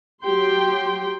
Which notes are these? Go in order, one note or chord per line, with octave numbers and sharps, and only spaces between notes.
F#3 G4 G5 C6